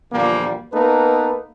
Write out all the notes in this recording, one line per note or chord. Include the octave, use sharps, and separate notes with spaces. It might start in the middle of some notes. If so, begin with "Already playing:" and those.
E2 A#2 D3 F3 G3 A#3
A#3 B3 D#4 A4 B4